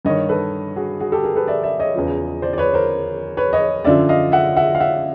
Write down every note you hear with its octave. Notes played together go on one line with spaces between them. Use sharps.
G2 D#3 C#5 D#5
A4 B4
F#4 G#4
F#4 G#4
G4 A4
G#4 A#4
A4 B4
D5 E5
D5 E5
C#5 D#5
E2 C#3 F3
C5 D5
D5
B4 C#5
A#4 C5
B4 C#5
C#5 D#5
F#2 D3 F3 D5 E5
D#5 F5
E5 F#5
E5 F#5
F5
E5 F#5